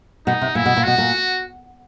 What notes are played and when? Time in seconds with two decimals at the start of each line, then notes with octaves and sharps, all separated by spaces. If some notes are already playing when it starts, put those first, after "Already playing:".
0.27 B2 D#4
0.42 C3
0.55 A#2 E4
0.66 B2
0.77 A#2
0.84 B2 F#4
0.98 A#2